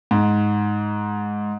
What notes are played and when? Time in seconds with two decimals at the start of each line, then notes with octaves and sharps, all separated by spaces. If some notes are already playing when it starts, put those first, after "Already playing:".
0.11 G#2